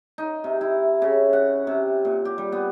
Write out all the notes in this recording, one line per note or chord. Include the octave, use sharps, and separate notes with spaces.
D#4
C3
E4
C#3
F#5
C3
A#2
G4
G3
B3